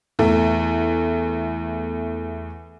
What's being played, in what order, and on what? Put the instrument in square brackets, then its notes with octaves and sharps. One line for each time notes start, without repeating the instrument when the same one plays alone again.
[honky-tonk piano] E2 A3